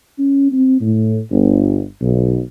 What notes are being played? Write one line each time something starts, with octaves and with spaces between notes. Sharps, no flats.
C#4
C4
A2
G1
B1